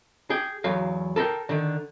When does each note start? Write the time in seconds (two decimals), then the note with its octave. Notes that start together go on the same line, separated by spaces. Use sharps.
0.30 G#4 G5
0.64 E2 F#3 F5
1.16 A4 A#4 D5 G5
1.49 D3 D#3